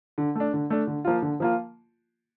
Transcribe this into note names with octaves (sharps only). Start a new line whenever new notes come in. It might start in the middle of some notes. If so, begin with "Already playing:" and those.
D3
A3 D4
D3
A3 D4
D3
F3 A#3 F4
D3
F3 A#3 F4